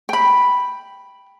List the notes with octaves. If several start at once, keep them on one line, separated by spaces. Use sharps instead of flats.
G5 B5